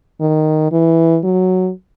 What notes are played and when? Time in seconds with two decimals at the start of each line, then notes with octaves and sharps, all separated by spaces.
0.20 D#3
0.72 E3
1.24 F#3